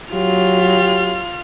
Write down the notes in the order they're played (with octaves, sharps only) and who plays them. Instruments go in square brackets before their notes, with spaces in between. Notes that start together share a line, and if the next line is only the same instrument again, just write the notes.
[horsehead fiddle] F#3 [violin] F4 F6 [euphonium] G4